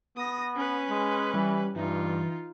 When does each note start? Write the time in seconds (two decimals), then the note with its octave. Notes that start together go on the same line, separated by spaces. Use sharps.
0.17 B3 D#6 A#6
0.56 C#4 B4
0.90 G#3
1.34 E3 G3
1.76 G2 E3 D#4 F4